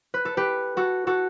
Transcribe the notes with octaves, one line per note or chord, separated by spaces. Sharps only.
B4
A4
G4 B4
F#4 A4
F#4 A4